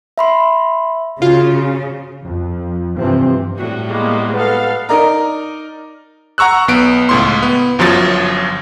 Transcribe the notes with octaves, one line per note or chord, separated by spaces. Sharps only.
E5 B5 C6
C#3 F4 F#4
F2
G2 C3 E3 F3 C4
A2 G3 F#4
G#3 A#3 B3
B3 A4 F5
D#4 A#4 D5 A#5
F#5 A#5 C#6 E6 F#6
B1 B3 D7
C#2 A2 C6
B3
G1 F#2 F3 F#3 A6